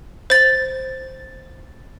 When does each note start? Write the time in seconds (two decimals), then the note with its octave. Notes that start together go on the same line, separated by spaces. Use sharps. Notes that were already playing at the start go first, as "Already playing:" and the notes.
0.30 C5 A6